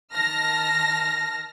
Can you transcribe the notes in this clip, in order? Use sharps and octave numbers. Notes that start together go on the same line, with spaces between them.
D#3 A5 F6 A#6